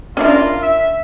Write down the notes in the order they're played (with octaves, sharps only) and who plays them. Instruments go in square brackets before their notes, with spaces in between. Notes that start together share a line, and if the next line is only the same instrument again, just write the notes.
[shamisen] C#4 D4 E4 [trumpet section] F4 A#4
[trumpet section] E5